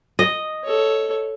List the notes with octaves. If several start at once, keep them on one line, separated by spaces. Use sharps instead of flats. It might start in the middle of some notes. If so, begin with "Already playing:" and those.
D#5
A4 C#5